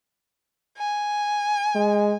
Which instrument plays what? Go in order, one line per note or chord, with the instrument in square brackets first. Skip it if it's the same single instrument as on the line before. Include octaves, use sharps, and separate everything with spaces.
[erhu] G#5
[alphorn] G#3